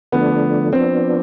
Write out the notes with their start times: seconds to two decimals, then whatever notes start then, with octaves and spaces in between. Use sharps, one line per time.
0.12 D3 F3 A3 B3 D4
0.72 F3 B3 C4 D4